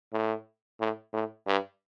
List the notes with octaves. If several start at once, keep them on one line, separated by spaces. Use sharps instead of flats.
A2
A2
A2
G2